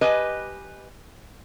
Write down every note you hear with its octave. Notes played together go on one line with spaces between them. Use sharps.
G4 B4 D#5 G#5